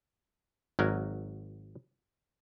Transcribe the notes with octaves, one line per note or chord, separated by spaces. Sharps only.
G#1 F#3 A#4